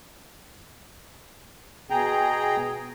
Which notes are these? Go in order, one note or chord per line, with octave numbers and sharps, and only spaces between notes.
B2 G#4 G5 A#5